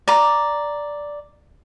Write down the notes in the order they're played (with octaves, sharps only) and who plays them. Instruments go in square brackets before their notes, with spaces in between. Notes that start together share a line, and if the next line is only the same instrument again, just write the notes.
[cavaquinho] D5 A#5